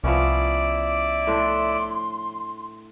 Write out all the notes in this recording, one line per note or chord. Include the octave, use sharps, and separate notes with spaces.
C2 F3 B3 C#4 E4 D5
A2 D4 C6